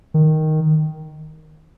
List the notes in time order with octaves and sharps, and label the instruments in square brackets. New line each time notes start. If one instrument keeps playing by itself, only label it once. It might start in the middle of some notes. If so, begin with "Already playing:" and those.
[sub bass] D#3